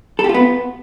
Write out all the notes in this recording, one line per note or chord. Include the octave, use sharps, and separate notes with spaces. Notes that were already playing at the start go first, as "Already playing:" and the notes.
A4
G4
F4
B3